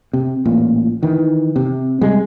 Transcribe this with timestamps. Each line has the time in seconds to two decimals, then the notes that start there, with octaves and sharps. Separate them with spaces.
0.13 C3
0.45 A1 A#2
1.03 D#3 E3
1.56 C3
2.01 C3 G3 G#3